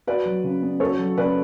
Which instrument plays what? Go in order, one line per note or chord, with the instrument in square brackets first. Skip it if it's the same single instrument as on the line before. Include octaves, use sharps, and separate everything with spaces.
[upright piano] F#4 [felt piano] B4 D5
[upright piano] F#3
C#3
B3
[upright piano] F#4 [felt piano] A4 C#5
[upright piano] F#3
[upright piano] C#3 [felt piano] B4 D5